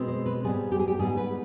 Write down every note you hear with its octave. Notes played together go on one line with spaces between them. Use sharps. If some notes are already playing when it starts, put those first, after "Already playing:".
Already playing: B2 G#3 C4
C5
B4
G#2 G3 B3 G#4
G4
G#4
G4
G#2 G3 B3 G#4
B4